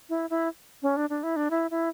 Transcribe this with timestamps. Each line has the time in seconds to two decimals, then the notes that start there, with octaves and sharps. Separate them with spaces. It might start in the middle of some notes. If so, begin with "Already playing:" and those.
0.09 E4
0.30 E4
0.82 C#4
0.97 D4
1.10 D4
1.23 E4
1.36 D4
1.51 E4
1.71 E4